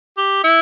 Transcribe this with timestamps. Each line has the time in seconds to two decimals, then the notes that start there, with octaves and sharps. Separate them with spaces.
0.18 G4
0.44 E4